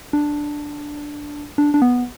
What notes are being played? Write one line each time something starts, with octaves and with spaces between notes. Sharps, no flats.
D4
D4
D4
B3